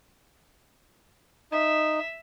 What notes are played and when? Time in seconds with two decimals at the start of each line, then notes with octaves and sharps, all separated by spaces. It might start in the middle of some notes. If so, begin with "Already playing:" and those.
1.52 D#4 E5